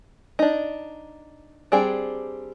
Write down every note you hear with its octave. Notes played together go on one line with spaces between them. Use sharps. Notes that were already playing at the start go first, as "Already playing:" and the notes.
D4 D#4
G3 C4 D4 G#4 G5